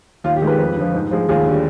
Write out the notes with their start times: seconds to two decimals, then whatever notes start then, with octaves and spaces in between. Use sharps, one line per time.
0.24 D#2 F4
0.36 G4
0.41 D#3 G#3
0.47 G4 B4
0.59 F2
0.77 D3 F3
0.94 G#2
1.11 F3 G#3
1.29 D#2 F4 G#4
1.46 D3 G3